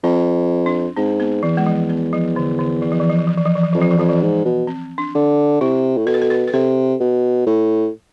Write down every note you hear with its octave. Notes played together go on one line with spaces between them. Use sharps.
F2 C4
D4
G#2 C4
B3
E2 E3
G#3
F3
B3
F3
D3
D3
E3
F3
E3
F3
E3
F3
E3
F3
E3
F3
F2 E3
F3
E3
F2 F3
E3
G#2
B2
C4
D4
D3
C3 E4
A2
B2 A4
B4
A4
B4
B4
C3 A4
B2
A2